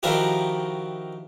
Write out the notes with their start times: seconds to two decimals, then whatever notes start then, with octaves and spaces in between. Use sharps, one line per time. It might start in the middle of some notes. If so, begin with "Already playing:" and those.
0.03 D#3 F3 D#4 E4 F#4 G4